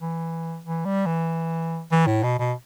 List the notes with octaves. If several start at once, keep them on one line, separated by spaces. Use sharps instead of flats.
E3
E3
G3
E3
E3
A2
B2
B2